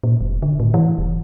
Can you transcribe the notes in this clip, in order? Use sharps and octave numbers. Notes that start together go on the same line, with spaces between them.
A#2
F1
D3
A2
E3
E1